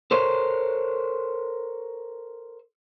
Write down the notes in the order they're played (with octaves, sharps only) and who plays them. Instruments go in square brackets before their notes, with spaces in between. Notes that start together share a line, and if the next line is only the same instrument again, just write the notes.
[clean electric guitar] A4 A#4 C5 C#5